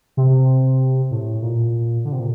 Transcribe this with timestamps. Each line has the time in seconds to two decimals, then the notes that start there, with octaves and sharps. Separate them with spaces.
0.17 C3
1.11 A2
1.42 A#2
2.05 D3
2.12 C3
2.20 A#2